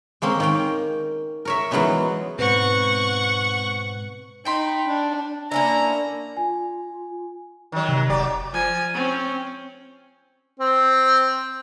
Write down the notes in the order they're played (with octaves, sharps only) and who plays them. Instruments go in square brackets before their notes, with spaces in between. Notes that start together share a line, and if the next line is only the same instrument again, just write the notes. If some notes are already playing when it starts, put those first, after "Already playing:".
[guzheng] G#3 A#3 C4 C#4 C6
D#3 C#4 G5
A#4 C#5 E5
E3 F#3 G#3 B3 C#4 D#4
[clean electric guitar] G#2 C4 [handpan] B2 B4 [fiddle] F#5 C#6
[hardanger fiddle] D#4 [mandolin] G5 B5 C6
[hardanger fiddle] D4
[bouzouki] A#3 C#4 E4 [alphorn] D4 [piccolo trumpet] A#5
[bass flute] F4 [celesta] G#5
[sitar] D#3 F#3
[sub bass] C3
[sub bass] F1 [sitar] F#3 G4 D5
[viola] F3 G#5
C4 C#4
[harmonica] C4